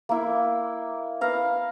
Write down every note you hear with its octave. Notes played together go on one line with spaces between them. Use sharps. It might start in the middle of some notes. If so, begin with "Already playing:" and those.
A#3 E4
B4 F5 A#5